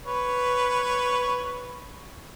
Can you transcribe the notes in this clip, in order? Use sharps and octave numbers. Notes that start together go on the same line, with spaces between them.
B4 C#5